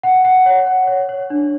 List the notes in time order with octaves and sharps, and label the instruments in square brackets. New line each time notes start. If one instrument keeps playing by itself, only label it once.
[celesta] F#5
F#5
C#5
F#5
C#5
C#5
D4